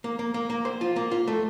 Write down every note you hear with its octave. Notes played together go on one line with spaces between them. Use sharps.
A#3
A#3
A#3
A#3
C5
F4
A#3
F4
A3